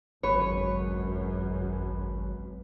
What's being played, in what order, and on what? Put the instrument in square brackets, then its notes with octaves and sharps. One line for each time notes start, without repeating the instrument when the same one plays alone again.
[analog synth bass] G#1 [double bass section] C#2 F#2 [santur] B4 [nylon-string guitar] C#5